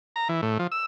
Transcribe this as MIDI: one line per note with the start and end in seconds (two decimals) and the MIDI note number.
0.16 0.28 82
0.29 0.41 52
0.42 0.58 45
0.59 0.67 53
0.72 0.86 88